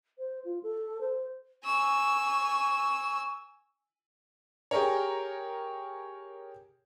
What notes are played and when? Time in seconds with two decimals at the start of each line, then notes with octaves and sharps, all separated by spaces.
0.18 C5
0.45 F4
0.63 A4
1.01 C5
1.64 G#5 C#6 E6
4.71 G4 G#4 A#4 C#5